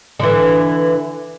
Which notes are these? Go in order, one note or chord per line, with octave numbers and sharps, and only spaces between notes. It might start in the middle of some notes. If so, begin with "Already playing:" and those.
D3 E3